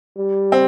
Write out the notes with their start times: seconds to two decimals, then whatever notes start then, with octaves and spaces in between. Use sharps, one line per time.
0.17 G3
0.52 C4